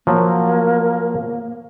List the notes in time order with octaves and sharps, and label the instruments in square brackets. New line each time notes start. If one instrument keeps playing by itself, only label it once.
[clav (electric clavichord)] F3 F#3 [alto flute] A#3